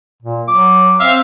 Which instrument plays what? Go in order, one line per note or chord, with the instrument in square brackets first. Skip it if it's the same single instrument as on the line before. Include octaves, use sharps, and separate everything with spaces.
[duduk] A#2
[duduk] F#3 [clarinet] D6
[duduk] C4 [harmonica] E5 F5